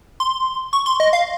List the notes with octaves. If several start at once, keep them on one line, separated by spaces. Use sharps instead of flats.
C6
C#6
C6
D#5
F5